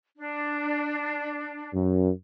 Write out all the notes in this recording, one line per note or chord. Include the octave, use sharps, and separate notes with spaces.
D4
F#2